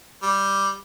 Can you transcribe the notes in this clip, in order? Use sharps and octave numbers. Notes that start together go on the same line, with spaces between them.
G3